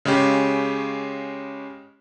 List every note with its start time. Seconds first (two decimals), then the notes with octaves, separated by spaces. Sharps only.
0.05 C#3 G#3 C#4 G4